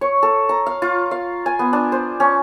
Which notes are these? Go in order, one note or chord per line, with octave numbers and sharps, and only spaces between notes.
C#5
A4
A#5
F5
F4
F5
G#5
B3
D4
C5
C#4